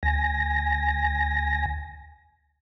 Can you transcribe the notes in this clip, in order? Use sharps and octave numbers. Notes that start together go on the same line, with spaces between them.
D2 G#5 A#6